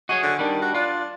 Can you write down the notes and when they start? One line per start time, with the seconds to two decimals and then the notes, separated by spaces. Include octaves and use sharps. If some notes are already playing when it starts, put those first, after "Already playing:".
0.09 F#4 G#4 C#5 D#5
0.22 D3
0.39 D#3 G3 D4
0.62 F#4
0.74 D4 F4